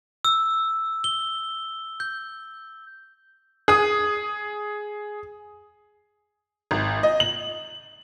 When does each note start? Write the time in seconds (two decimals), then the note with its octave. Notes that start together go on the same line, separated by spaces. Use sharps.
0.25 E6
1.04 G7
2.00 G6
3.68 G#4 D#6
6.71 G#1
7.03 D#5
7.20 F#7